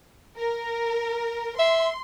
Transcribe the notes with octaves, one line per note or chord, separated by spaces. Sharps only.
A#4
E5 C6